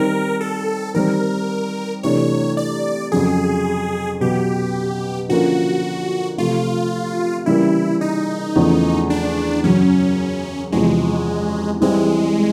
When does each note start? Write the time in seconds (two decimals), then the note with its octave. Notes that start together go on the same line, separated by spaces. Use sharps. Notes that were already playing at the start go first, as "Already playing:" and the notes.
Already playing: D#3 G3 C4 D#4 A#4
0.41 A4
0.94 D#3 G3 C4 A#4
2.03 C3 E3 A3 D4 C#5
2.57 D5
3.12 F2 C#3 F#3 G#4
4.21 B2 F#3 B3 G4
5.29 D3 F3 A#3 C#4 F4 F#4
6.38 C3 F3 A3 F4
7.46 C#3 E3 G3 A#3 E4
8.01 D#4
8.56 E2 C#3 F3 A3
9.10 D4
9.64 F#2 C#3 F#3 C#4
10.72 E2 C3 F3 G#3
11.81 E3 G3 G#3 C4 E4 G#4